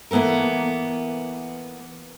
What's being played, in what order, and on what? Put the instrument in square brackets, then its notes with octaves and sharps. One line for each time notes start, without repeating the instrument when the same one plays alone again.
[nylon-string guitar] E3 A#3 B3 A4 A#4